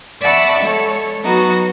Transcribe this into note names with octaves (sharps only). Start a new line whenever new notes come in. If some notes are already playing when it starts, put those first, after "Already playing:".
D5 E5 F#5 A5 B5 C#6
G#3 A4 C#5
F#3 B3 D#4 F#4